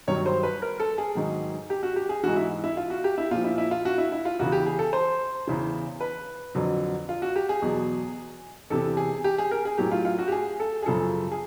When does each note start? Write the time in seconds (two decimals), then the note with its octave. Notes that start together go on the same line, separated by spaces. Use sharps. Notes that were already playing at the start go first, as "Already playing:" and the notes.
0.08 G2 D#3 F#3 C#5
0.26 C5
0.43 B4
0.62 A#4
0.80 A4
0.98 G#4
1.15 G#2 D#3 F#3
1.70 G4
1.83 F#4
1.96 G4
2.09 G#4
2.23 G#2 E3 F#4
2.36 E4
2.64 E4
2.77 F4
2.90 F#4
3.04 G4
3.18 E4
3.31 A#2 F3 F4
3.44 E4
3.58 E4
3.71 F4
3.85 F#4
3.98 E4
4.12 E4
4.25 F4
4.39 E2 C#3 E3 F#4
4.52 G4
4.66 G#4
4.79 A4
4.93 C5
5.47 E2 C#3 E3
6.01 B4
6.55 F2 D3 F#3
7.09 F4
7.22 F#4
7.36 G4
7.49 G#4
7.62 E2 B2 F#3
8.70 E2 C3 E3 A4
8.97 G#4
9.24 G4
9.38 G#4
9.51 A#4
9.65 G#4
9.78 A2 F#3 G4
9.92 F4
10.05 F4
10.19 F#4
10.28 G4
10.32 G#4
10.60 A4
10.82 G#4
10.86 F#2 C#3 F3 A4
11.32 G#4